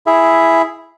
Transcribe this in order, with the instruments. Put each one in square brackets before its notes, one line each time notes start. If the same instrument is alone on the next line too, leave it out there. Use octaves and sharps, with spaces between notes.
[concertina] E4 G#4 E5